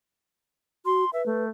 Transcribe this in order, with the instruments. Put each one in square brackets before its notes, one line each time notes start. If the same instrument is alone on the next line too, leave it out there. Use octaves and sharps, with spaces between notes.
[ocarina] F#4 [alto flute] C6
[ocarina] B4 [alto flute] E5
[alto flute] A3